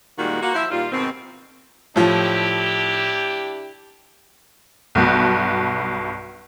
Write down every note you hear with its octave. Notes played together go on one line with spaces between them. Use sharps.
A#2 D#3 G3 G#3 A#3 F#4
A#3 F4 F#4
F3 E4 C5 E5
D#2 A#2 G3 F4
G#2 B2 D#3 C4
A2 F3 D4 E4 G4
B1 G2 B2